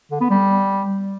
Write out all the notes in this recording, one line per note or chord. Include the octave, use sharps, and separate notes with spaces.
D3
B3
G3